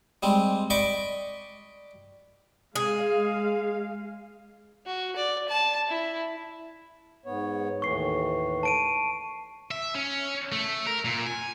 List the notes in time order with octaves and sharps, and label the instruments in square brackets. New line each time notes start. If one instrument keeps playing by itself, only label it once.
[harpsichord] G3 G#3 C4
D5 D#5 G5 B5 C#6 D6
[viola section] G#3 F5 [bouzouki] G#4
[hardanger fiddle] F#4
D5
A5
E4
[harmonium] G#2 B3 C#5
[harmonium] D#2 A2 E3 [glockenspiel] C#6 C7
[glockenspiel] A5 D7 D#7
[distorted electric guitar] E5
C#4
A3
A#4
A#2
G#5